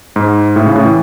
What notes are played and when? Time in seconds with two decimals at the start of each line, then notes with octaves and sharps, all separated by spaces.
0.16 G#2
0.56 A2
0.66 C#3
0.76 A2
0.85 E3